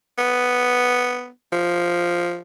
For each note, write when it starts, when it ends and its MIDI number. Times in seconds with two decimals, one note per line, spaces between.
0.18 1.29 59
1.52 2.38 53